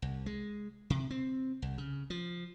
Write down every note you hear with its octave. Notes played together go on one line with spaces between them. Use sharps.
C2
G#3
C3
C4
C2
C#3
F3